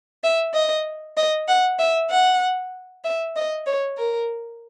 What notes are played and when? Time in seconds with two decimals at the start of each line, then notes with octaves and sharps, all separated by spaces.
0.24 E5
0.54 D#5
1.17 D#5
1.48 F#5
1.79 E5
2.11 F#5
3.05 E5
3.36 D#5
3.67 C#5
3.98 A#4